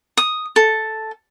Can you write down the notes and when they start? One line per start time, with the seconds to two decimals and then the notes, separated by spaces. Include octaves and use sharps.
0.17 D#6
0.56 A4